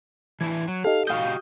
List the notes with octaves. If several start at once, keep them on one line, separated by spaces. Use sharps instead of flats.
E3 D4 E4 G#6
F#3
D#4 G4 A4 F5
F#4 G4 D#5 F5 D#6 G6